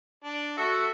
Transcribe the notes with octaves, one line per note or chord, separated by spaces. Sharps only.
D4
F#4 A4 E5